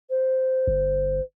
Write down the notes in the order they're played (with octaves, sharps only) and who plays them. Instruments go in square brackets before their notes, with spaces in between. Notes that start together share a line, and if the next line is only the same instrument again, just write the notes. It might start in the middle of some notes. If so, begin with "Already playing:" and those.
[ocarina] C5
[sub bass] G1